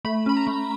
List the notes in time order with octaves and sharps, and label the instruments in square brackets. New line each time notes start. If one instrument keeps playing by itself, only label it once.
[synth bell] A3 B5
C#4 B5
A#5
A3